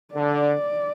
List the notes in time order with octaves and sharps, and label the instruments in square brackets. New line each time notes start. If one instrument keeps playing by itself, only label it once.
[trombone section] D3 [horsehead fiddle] D5